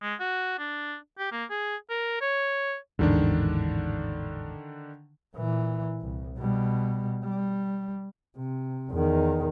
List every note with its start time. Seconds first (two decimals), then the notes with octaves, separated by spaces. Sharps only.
0.02 G#3
0.20 F#4
0.58 D4
1.19 G4
1.32 A#3
1.50 G#4
1.90 A#4
2.21 C#5
2.99 A1 E2 G#2 D3 D#3 D4
5.35 A#2 E3
6.01 C2
6.38 B2 G3
7.24 G3
8.37 C3
8.91 E2 D#3